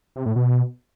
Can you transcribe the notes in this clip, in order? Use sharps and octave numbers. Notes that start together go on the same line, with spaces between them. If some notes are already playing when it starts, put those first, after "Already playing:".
C3
A2
B2